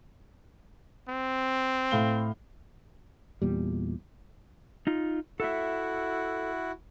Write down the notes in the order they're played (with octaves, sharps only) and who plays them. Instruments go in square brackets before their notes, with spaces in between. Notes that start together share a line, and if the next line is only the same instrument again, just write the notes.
[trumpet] C4
[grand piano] A2 F5 G7
[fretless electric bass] E2 A#2 G3
[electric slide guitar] D#4 F4
[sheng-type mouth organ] E4 F#4 [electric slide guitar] A4 E5